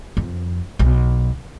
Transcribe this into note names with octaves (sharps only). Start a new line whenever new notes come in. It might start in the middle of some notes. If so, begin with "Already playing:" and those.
F2
B1